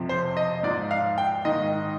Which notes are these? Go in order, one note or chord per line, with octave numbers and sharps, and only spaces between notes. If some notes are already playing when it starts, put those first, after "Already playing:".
Already playing: F2 C3 F3
C5
D#5
G#2 F3 D5
F5
G5
G#2 D#3 D#5